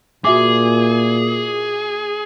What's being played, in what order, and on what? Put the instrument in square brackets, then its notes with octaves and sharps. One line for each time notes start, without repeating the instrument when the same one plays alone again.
[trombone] A#2 [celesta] F#4 E5 D6 [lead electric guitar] G#4